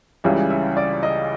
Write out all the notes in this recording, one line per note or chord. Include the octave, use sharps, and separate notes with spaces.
C#2 C#3 E3 G3 E5
E5
D5
D#5